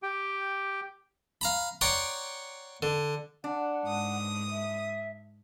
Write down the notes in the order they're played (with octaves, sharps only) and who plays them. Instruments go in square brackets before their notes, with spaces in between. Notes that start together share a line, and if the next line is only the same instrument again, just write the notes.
[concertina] G4 G5
[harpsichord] F5 A#5 B5
C#5 D5 F#5 G5 A#5 C6
D3
[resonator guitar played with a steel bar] D4 [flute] F#5
[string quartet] G#2 D#6
[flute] E5